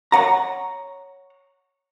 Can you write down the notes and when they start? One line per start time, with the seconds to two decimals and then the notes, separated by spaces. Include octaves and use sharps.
0.12 C#5 D5 F#5 A#5